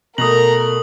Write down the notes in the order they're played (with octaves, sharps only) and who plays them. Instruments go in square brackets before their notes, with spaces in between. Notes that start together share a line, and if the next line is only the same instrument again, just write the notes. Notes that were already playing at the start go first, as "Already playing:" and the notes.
[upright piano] B2 A3 [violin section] A#4 [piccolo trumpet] A#5 [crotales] D#6 F#7